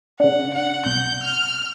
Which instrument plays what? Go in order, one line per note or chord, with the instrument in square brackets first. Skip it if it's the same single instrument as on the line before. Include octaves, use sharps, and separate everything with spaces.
[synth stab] C#3 D4 [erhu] F#5
[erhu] F#5
[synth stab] C2 [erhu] G6
[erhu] F6